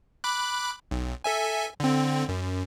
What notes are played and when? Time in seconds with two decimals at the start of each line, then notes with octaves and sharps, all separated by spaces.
0.24 B5 D6 F#6
0.91 B1
1.24 A4 E5 G#5
1.80 D3 C4
2.29 F#2